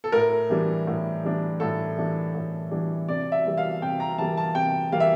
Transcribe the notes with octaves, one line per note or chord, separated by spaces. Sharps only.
A4
A2 A#4
E3 G3 D4
A2
E3 G3 D4
A2 A4
E3 G3 D4
A2
E3 G3 D4
C3 D5
E5
E3 G3 A#3
F5
C3 G5
A#5
E3 G3 A#3 A5
A5
C3 G5
E3 G3 A#3 F5
E5